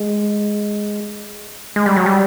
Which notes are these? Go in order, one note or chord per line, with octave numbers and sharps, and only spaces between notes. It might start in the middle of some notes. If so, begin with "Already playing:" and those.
Already playing: G#3
G#3
G3
F#3
G3